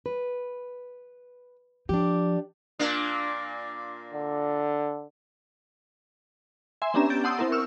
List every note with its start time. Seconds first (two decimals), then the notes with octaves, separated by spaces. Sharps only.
0.06 B4
1.89 F3 D4 G4
2.79 A#2 A#3 D4
4.14 D3
6.82 E5 G#5 C6
6.94 B3 C#4 D4 G4 A#5 E7
7.10 G6 A6 D7
7.24 F#5 A5 C6 D#6 E6 G6
7.39 C4 E4 A#4
7.52 C#6 E6 F6